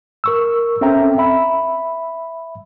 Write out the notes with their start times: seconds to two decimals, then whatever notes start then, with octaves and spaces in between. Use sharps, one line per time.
0.24 A#4 C#6 E6
0.81 C4 C#4 A4 E5 G5 A#5
1.18 E5 B5